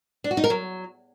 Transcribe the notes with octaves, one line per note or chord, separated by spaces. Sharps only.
D4
F#4
D#4
A#4
F#3